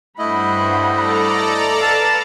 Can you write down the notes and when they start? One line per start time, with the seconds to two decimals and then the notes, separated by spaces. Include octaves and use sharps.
0.19 G2 A3 E4 C5 D#5 F#5 B5
0.88 A4 D5 A#5
1.82 B4 F5 A5